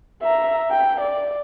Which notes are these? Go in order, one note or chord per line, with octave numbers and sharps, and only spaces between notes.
E5 A#5
G5
D5